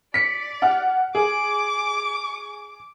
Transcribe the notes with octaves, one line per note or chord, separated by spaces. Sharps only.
D5 B6 C#7
F#5 F6
G#4 D6